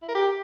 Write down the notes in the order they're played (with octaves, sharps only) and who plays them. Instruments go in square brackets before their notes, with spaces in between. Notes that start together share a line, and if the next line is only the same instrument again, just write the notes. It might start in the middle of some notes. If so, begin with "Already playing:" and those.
[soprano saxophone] E4
A#4
G4